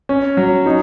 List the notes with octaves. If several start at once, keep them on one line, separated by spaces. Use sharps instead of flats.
C#4
F#3
D#4